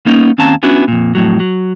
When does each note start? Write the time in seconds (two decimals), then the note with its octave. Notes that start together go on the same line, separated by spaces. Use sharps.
0.06 A#3 B3 C#4 D#4
0.38 D#2 C4 C#4 F5 A5 A#5
0.63 B3 C#4 D4 E4 F#4
0.88 F2 A#2
1.15 F2 A2 F#3
1.40 F#3